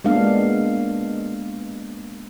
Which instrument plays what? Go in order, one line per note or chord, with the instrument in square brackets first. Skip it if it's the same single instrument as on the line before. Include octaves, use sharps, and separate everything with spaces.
[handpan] G#3 A#3 B3 D4 F5